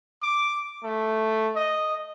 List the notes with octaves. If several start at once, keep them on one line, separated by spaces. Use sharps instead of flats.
D6
A3
D#5